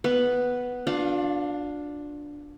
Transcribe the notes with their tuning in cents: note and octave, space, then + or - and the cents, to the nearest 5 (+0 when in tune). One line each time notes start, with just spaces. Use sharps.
B3 +0 B4 +0
D4 +0 F4 +40 F5 +0